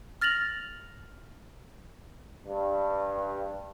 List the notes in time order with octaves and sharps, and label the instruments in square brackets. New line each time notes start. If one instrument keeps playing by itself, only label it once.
[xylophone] F6 A6 A#6 F7 F#7
[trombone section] G2